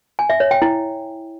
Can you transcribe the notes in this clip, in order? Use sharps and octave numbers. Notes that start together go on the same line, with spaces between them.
G#5
E5
C#5
G5
E4